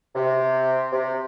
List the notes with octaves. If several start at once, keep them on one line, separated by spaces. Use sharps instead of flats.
C3
C3